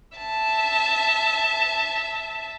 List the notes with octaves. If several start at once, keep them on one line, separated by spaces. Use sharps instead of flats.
E5 A5